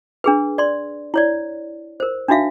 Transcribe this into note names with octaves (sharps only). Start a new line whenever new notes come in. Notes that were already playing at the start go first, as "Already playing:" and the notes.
D4 G#4 B4
D5 C6
E4 C#5 D5
A#4 C5
D4 D#4 F#4 E5 F5